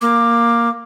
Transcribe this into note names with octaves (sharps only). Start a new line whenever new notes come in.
A#3 D6